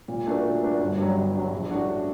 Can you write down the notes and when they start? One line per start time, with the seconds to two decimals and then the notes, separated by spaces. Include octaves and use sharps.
0.08 A#2
0.26 A3 D4 F#4 A#4
0.44 A#2
0.63 A3 D4 F#4 A#4
0.80 G1
0.98 G2 F#3
1.17 G1
1.34 G2 F#3
1.53 A#1
1.70 A2 A3 D4 F#4